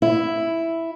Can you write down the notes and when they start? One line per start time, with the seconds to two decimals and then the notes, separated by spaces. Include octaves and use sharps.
0.02 E4